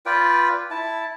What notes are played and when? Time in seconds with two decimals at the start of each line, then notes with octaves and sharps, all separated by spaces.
0.06 F4 B4 D5 G5
0.71 E4 A5